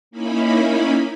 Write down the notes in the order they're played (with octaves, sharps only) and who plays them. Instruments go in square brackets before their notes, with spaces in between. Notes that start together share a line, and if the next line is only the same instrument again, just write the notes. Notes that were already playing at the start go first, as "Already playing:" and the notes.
[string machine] A#3 C#4 D#4 E4 B5